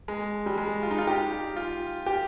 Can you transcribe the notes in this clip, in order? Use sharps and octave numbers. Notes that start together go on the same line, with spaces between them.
G#3
G3
G#3
F4
D#4
F4
G4
F4
G4